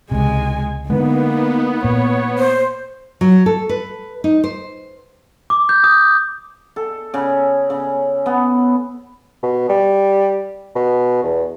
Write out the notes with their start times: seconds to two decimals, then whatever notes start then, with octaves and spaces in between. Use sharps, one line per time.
0.11 C#2 C3 G#3 G#5
0.90 D3 G#3 A#3 B3 D#4
1.84 A#2 C#5
2.38 C5
3.21 F#3
3.46 A4
3.69 B4
4.24 D#4
4.44 C5
5.50 D6
5.69 G6
5.84 D#6
6.76 A4
7.14 C#3
7.70 C#3
8.26 B3
9.43 B2
9.69 G3
10.76 B2
11.23 E2